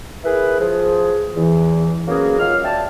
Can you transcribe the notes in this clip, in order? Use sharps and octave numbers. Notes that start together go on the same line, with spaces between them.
E4 G#4 A#4 B4
F3 G#4
E2 E3
F#3 A#3 B3 C#4 F#4 G#4
D#3 F#3 G#3 F4 F5 F6
D5 E5 G5 A5